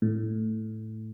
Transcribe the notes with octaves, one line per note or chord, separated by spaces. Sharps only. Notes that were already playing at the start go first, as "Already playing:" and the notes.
A2